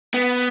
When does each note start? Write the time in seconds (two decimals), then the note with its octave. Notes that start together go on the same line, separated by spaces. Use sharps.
0.14 B3